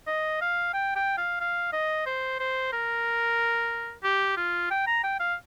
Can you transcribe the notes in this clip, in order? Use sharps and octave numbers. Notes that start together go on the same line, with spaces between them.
D#5
F5
G5
G5
F5
F5
D#5
C5
C5
A#4
G4
F4
G5
A#5
G5
F5